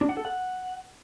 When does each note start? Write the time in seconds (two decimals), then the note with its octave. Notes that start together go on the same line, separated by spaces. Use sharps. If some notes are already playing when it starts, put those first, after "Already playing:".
0.01 D4
0.09 F#5
0.17 A4
0.25 F#5